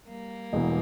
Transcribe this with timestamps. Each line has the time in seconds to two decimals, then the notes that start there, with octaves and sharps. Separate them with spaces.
0.08 G3 A#3
0.53 E1 E2 E3